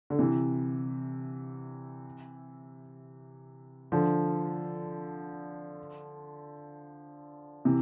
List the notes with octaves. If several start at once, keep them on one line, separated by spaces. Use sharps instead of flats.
D3
C3 E3
D3 F3
C3 E3